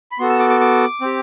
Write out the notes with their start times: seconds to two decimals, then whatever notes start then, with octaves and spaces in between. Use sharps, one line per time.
0.12 B5
0.19 B3 F#4 A4 C6
0.29 E6
0.39 D6
0.50 D6
0.61 D6
1.01 C4 G4